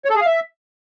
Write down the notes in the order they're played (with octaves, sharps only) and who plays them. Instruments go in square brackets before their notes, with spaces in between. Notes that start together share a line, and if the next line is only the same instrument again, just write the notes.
[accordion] C#5
A4
G#4
F5
E5